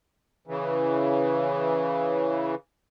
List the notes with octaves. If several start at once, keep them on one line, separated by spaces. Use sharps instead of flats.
C#3 E3